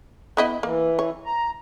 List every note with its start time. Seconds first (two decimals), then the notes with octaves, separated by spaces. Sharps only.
0.37 B3 E4 D#5
0.63 E3 A#3
0.99 C#5
1.26 A#5